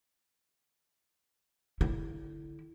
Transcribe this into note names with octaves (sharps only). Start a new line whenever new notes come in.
D3 E4